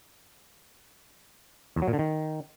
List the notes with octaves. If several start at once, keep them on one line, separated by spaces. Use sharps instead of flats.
E2
F#3
A#2
D3
D#3